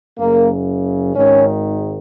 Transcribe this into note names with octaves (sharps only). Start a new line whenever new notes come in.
F#1 F#2 C#3 A#3
G#1 G#2 D#3 C#4